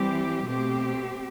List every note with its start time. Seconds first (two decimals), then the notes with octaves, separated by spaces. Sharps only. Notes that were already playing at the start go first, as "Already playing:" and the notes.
Already playing: E3 G3 C4 G4
0.45 B2 A3 C4 G4